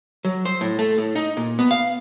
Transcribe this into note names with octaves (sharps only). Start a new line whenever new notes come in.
F#3
C5
A2
A3
A2
D#4
A#2
B3
F5